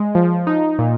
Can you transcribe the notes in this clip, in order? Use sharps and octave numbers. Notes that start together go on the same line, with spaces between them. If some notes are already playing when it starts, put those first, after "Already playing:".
Already playing: G#3
F3
D#4
A#2